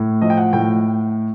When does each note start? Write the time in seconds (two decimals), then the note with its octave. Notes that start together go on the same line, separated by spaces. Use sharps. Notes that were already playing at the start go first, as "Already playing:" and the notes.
Already playing: A2
0.21 F3 D#5
0.30 G5
0.37 F#5
0.53 A2 G5